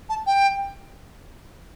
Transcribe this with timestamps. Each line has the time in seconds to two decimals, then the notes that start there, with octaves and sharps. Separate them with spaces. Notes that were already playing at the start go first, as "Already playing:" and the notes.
0.09 A5
0.26 G5